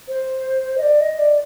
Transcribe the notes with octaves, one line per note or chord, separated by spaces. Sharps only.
C5
D#5
D5
D#5
D5